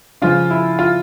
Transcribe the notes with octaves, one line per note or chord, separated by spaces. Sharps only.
C#3 F3 F4
E4
F4